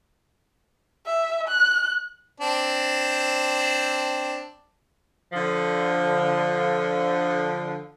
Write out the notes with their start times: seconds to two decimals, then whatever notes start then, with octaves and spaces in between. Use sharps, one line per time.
1.07 E5
1.48 F#6
2.40 C4 D4
5.33 D3 F3